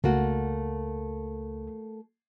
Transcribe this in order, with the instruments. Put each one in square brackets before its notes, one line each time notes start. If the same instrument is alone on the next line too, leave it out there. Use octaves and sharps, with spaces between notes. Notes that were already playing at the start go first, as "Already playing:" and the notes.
[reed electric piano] C#2 [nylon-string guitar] A3 A#3 F#4